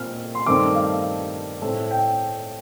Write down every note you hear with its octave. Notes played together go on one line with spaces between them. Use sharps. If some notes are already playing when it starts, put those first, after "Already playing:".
Already playing: A#2 C4 F6
C6
G2 D#3 A3 C4 D6
F5
A2 A3 C4
G5